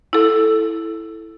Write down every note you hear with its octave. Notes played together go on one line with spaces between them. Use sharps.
E4 A4